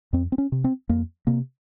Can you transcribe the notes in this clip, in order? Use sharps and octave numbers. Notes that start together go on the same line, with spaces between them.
F2 C4
C4
C#4
C3
C4
F2 A#3
C3 A#3